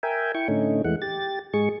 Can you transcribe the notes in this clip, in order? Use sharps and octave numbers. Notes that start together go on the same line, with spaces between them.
A#4 E5 G5 G#5
E4 G5 C#6
A2 D3 A3 C#4 D#4
E2 E3 G#3 A3 F#5
G4 A6
G#2 G#3 G#4 C#6